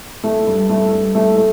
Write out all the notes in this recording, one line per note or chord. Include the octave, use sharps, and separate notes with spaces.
A3
G2
A3
G2
A3
A3